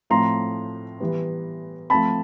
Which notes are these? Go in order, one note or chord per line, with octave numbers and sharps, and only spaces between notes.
A2 F3 A3 C4 A#5 C6
E3 G3 B3
F3 A3 C4 A5 B5